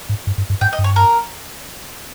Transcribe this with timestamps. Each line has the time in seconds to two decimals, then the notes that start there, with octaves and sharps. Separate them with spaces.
0.09 G#2
0.27 G2
0.38 G2
0.50 G2
0.61 G#2 G5
0.73 D#5
0.79 G2
0.84 C#5
0.96 A#4